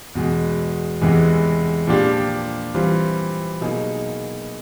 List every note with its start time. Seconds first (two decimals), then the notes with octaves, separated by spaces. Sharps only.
0.15 E2 B2 G#3
1.02 E2 C3 E3 G#3
1.87 A#2 F3 A#3 D4 G4
2.74 E3 G3 C4 F4
3.61 B2 F#3 A#3 D#4 G#4